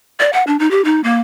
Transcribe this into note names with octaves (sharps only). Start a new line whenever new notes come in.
D5
F#5
D4
D#4
G4
D#4
A#3